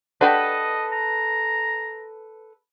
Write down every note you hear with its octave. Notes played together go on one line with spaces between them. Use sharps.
D4 F#4 G4 A4 B4 D#5
A#5